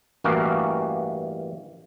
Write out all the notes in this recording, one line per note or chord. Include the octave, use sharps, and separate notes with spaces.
A1 G2 E3 A#3 F#4 F5